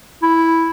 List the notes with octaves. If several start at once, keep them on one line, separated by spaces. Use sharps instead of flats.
E4